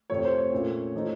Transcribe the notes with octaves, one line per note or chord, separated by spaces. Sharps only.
F2 C3 F3 A3 C#5
C5
C#5
A#2 A3 C#4 F4
F3 A3 D#4